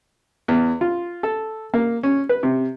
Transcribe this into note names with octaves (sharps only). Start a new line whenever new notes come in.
E2
F4
A4
A#3
C#4
B4
C3